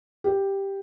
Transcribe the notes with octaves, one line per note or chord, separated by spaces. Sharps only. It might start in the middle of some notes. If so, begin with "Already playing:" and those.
G4